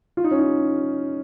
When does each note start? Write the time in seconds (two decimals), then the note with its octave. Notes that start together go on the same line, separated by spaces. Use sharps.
0.17 F4
0.24 D#4
0.31 C#4
0.39 D#4